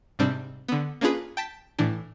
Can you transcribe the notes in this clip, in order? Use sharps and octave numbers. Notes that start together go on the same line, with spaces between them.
G#2 C3 G3 C4 D4
D3 B3
A#3 C#4 D4 F4 G#4 B4
G5 A5 B6
A2 E3 D4